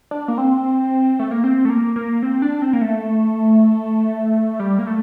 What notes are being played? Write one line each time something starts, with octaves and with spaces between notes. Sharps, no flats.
D4
A#3
C4
A3
A#3
C4
A3
A#3
A#3
C4
D4
C4
A#3
A3
G3
A#3
A3